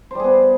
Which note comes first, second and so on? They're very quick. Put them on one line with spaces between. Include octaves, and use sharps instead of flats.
C5 G3 G#4 B3